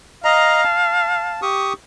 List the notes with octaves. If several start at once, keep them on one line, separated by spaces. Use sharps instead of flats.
D#5 F5 A#5
A5
G4 C#6 D#6